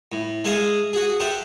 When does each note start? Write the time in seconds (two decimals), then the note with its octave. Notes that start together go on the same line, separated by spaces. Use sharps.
0.12 A2
0.44 G#3 A4 E5 F5 G#5 D#6
0.93 F#4 G#4
1.20 G4 A4 C5 E5 F#5